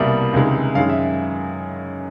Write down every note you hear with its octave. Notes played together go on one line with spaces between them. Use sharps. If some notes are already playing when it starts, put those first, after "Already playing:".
Already playing: C2 B2 G3 A#3 E5
C#2 C3 D#3 G#3
F#2 D#3 G#3 F5
E5